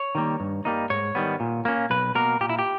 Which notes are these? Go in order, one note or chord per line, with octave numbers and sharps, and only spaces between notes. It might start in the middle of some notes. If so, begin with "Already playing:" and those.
Already playing: C#5
D#3 G3 A#3
G2
G3 A#3 D#4
G#2 C#5
D#3 G3 B3
A#2
A#3 C#4
B1 B4
B2 A#3 A#4
A#2 G4
E4
G4